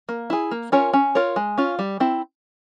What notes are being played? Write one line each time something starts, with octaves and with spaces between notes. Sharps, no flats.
A#3
E4 G#4
A#3
C#4 F4 A#4 C#5
C#4
F4 A#4 C#5
G#3
C#4 F4
G3
C4 E4